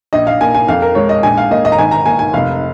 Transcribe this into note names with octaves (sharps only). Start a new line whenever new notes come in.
A#1 D#5
F5
A#3 G#5
G#5
F2 F5
A#4
G#3 C#5
D#5
A#1 G#5
F5
A#3 D#5
D#5
A#5
G#1 G#5
A#5
A#3 G#5
G#5
F1 F5